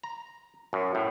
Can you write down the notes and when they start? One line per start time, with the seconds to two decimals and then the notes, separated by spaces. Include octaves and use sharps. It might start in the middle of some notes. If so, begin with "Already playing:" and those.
0.03 A#5
0.73 F#2
0.95 A2